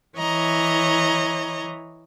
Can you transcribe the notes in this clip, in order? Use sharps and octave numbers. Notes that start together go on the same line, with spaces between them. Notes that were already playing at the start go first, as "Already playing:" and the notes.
E3 C#5 D#5 A#5